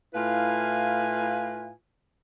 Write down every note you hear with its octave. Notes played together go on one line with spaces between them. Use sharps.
A2 E4 F4 B4 F5 G#5